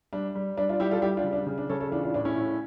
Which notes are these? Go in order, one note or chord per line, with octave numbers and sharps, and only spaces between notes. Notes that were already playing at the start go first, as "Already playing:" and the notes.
G3 D4
G3
G3 D4
D4 F4
G3 E4 G4
F4 A4
G3 E4 G4
D4 F4
C#3
D4
C#3
D4
C#3 A4 C#5
A4 C#5
E3 D4 F4
D4 F4
A2 D4
C#4 E4
A2